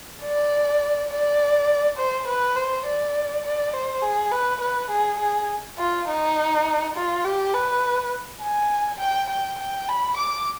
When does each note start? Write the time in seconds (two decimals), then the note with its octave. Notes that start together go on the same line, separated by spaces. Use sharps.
0.23 D5
1.10 D5
1.98 C5
2.28 B4
2.56 C5
2.86 D5
3.45 D5
3.74 C5
4.02 G#4
4.32 B4
4.61 B4
4.91 G#4
5.20 G#4
5.78 F4
6.08 D#4
6.96 F4
7.25 G4
7.54 B4
8.42 G#5
9.00 G5
9.30 G5
9.59 G5
9.89 B5
10.17 D6